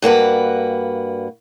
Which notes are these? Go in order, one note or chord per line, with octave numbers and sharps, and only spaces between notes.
G2 A#3 F#4 B4